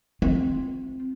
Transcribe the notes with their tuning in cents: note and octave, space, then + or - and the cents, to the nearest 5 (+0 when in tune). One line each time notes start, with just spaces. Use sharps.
C4 +0 F4 +0